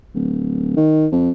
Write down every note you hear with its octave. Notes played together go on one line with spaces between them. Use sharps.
D1
D#3
F2